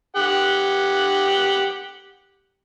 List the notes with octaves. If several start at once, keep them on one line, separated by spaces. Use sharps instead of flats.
G4 F#5